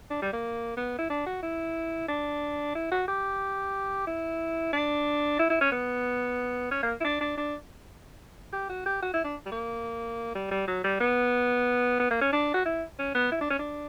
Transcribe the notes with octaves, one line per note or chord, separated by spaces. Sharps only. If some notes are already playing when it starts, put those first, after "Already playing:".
D4
G3
A#3
B3
E4
D4
F#4
E4
D4
E4
F#4
G4
E4
D4
E4
E4
C#4
B3
C#4
A#3
E4
D4
D4
D4
G4
F#4
G4
F#4
E4
D4
G3
A#3
G3
G3
F#3
G3
B3
B3
A#3
C#4
D4
F#4
E4
C#4
B3
E4
D4
C#4
D4